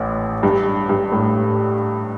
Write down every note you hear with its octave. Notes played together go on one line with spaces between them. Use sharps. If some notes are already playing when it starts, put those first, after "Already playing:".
Already playing: A1 A2
G2
G2
A2